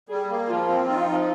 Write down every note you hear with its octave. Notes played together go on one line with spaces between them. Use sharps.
G3 G#4
A#3
F3 F4
C4
D#4 F4
F3